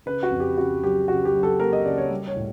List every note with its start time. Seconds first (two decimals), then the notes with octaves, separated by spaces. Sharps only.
0.06 C#3 B4
0.23 F#4
0.31 F2
0.40 G4
0.58 C#3 F#4
0.83 F#3 G4
1.08 C#3 F#4
1.25 G4
1.33 F#3
1.43 A4
1.60 A#3 A#4
1.73 D#5
1.85 C#3 D5
1.98 C#5
2.10 G3
2.27 C#5
2.36 A2